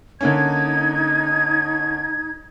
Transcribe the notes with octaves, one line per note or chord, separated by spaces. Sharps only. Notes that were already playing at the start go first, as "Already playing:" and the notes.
D3 A#3 C#4 D#4 G#6